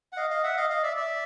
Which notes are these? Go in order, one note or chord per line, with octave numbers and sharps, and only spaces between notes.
F#5
D#5 F5
D#5 F5
E5 F#5
D#5 F5
D#5 F5
D5 E5
D5 E5